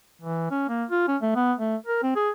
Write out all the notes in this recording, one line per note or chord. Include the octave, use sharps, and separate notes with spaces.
E3
C#4
A#3
F4
C#4
A3
B3
A3
A#4
C4
G#4